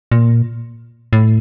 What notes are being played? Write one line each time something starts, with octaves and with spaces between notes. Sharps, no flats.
A#2
A2